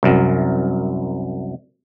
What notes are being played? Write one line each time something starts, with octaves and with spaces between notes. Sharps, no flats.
C2 F#2